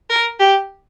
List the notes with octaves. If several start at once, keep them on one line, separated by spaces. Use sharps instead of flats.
A#4
G4